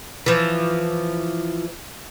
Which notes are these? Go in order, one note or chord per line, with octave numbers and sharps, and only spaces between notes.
E3 F3